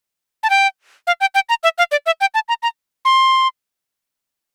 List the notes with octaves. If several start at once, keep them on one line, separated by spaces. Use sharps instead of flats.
A5
G5
F5
G5
G5
A#5
E5
F5
D5
E5
G5
A5
A#5
A#5
C6